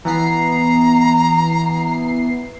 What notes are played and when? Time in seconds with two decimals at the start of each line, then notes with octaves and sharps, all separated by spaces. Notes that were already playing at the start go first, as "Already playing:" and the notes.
0.05 E3 B3 A#5 C7